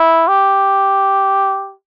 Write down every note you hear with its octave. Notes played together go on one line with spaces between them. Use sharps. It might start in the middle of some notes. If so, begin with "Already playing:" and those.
Already playing: E4
G4